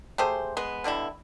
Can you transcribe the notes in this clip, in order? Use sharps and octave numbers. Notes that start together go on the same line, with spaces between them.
A3 G4 G#4 C5
G#3 B3
B2 D3 G3 E4